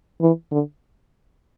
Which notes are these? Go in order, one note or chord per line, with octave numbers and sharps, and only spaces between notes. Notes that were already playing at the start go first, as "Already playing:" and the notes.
E3
D3